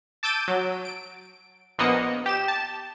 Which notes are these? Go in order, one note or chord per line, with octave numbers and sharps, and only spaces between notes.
A5 D6 E6 G6 D7 D#7
F#3
D7
A#1 A#3 B3 D#5 C#7
G4 E7
A5